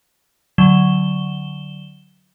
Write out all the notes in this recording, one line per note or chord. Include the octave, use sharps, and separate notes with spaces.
D3 F#3 E7 G7